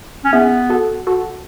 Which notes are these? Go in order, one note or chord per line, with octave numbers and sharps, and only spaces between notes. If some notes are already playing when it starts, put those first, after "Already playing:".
C#4
B3 E4 G#4
F#4 A4
F#4 A4